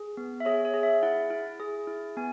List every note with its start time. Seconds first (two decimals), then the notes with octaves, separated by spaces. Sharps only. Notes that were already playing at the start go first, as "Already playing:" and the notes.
Already playing: G#4
0.17 B3
0.40 E5
0.45 G#4 C#5
0.65 C#5
0.74 G#4
0.83 E5
1.03 E4 F#5
1.30 E4
1.60 G#4
1.87 E4
2.17 B3 G#5